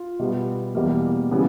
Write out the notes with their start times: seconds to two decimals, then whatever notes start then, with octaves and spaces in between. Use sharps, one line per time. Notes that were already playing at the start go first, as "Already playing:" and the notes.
Already playing: F4
0.19 B2 G3 B3
0.75 E2 B2 G3 A#3
1.31 C#3 E3 G3 B3